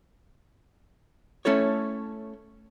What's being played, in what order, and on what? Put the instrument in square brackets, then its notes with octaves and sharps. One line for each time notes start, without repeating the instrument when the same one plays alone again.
[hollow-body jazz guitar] A3 C#4 E4 A4 C#5